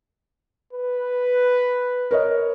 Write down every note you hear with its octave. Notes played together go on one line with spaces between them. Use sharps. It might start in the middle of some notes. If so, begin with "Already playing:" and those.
B4
A#4 C#5 D#5